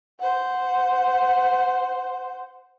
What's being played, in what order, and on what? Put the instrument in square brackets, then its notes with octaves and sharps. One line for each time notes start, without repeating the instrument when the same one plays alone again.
[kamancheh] C5 F#5